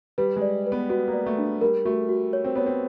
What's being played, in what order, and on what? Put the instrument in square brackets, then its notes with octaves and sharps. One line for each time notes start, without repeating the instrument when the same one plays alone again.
[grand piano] G3 [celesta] B4
[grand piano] G#3
[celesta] D5
B4
[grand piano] B3
[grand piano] B3 [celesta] F#4
[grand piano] A#3
[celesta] D5
[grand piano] A3
[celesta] D4
[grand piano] G3 [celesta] A#4
[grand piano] A3 [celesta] F#4
[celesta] F#4
C#5
[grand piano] C4
[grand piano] B3 [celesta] C#5
[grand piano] C4